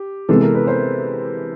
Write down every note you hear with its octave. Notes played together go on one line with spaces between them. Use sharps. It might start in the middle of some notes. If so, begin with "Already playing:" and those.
Already playing: G4
C3 E3 G#3 B3 A4
A#4
B4
C5